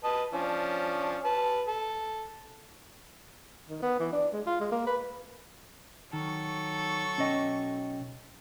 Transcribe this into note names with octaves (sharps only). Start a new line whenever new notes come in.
B4 D#5 A5
F3 C#4 D4
B4 A5
A4
D#3
B3
E3
D4
G#3
F4
G#3
A#3
B4
D#3 F#3 A4 C#6
B1 C#4 C#5 D#5 G5